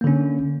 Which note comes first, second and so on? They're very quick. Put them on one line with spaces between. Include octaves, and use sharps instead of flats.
A#3 D3 C#4